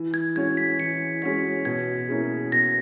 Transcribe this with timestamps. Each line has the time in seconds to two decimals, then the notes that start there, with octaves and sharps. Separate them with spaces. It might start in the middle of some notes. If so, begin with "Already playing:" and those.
Already playing: E3
0.14 G#6
0.36 G#3 C#4 F#4 C#5 G#6
0.57 B6
0.79 E3 C#7
1.22 G#3 C#4 F#4 C#5 B6
1.65 B2 G#6
2.08 A#3 C#4 E4 G#4
2.52 B2 A#6